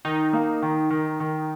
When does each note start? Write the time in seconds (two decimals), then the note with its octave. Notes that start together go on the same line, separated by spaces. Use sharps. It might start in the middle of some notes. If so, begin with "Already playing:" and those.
0.05 D#3 D#4
0.33 A#3
0.62 D#3
0.90 D#3
1.20 D#3